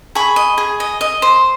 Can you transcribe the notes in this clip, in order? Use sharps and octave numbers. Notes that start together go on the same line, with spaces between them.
G#4 B5 C#6
D#5
G#4
D#5
D#5
C5